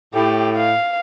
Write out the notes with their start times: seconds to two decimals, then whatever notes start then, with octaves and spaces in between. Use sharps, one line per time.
0.14 A2 G4
0.57 F5